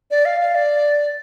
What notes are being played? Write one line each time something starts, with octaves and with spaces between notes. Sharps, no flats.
D5
F5
F5
D5